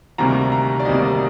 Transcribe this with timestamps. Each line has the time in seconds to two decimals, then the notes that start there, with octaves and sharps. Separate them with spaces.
0.18 D2 C3 D#3 G3 A#3 A#5
0.52 A#5
0.80 D5
0.85 D2 C3 D#3 G3 A#3 D#5
1.02 D5